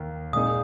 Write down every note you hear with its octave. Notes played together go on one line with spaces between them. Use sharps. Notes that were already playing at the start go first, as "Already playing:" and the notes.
Already playing: D#2 D#3
A#2 G#3 D#4 G#4 D#6